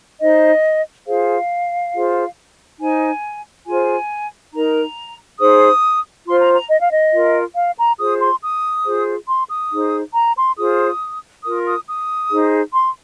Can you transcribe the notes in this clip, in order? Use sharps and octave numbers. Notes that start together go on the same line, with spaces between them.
D#4 C5 D#5
F4 G#4 C5 F5
F4 G#4 C5
D#4 C5 G#5
F4 G#4 C5 G#5
D#4 A#4 A#5
D#4 G#4 C5 D#6
F4 C5 C6
A#5
A#5
D#5
F5
D#5
F4 A#4
F5
A#5
F4 G#4 C5 D#6
C6
D#6
F4 G#4 C5
C6
D#6
D#4 G#4 C5
A#5
C6
F4 G#4 C5 D#6
F4 A#4 D#6
D#6
D#6
D#4 G#4 C5
C6